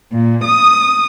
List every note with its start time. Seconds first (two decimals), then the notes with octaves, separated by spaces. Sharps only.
0.13 A#2
0.43 D#6